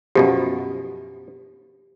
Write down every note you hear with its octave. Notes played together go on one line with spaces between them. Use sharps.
F#2 B2 F3 G4